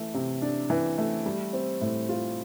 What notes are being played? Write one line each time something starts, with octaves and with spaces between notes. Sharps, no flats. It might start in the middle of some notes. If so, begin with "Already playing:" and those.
Already playing: E3 A3
C3
D4
E3
A3
G3
C4
A2
F4